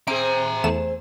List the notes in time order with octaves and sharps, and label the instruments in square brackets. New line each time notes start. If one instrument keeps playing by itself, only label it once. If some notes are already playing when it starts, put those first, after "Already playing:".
[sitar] C4 G#4 [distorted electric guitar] E5 A#5 [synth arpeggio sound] D7
[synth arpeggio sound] E2 A3 E7